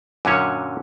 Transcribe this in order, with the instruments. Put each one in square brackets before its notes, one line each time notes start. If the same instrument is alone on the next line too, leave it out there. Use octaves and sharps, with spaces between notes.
[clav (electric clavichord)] F#2 A#2 D3 F#3 C#4 C#5